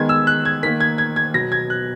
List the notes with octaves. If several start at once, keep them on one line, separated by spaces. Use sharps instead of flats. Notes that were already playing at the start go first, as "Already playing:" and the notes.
Already playing: D#3 G#3 B3 G#6
E6
F#6
G#6
D#3 A#3 B6
G#6
G#6
G#6
B2 F#3 B3 A#6
G#6
F#6